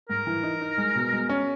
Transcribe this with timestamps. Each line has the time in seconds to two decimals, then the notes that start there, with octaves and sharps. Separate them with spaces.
0.09 G#2 A#4
0.27 E3
0.43 D#4
0.61 D#4
0.78 G#3
0.95 B2
1.13 G#3
1.29 C#4